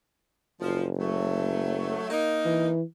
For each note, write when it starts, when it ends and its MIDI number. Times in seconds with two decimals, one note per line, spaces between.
0.61 1.96 30
0.61 0.84 53
0.99 2.08 54
0.99 2.08 57
2.10 2.68 58
2.10 2.68 63
2.46 2.82 52